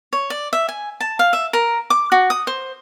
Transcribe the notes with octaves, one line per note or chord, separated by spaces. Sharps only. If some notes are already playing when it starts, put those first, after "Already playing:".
C#5
D5
E5
G#5
A5
F5
E5
A#4
D6
F#4
D#6
C5